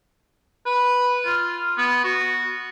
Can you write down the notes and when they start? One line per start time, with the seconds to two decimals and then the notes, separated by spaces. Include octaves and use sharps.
0.66 B4
1.26 F4
1.78 B3
2.04 F#4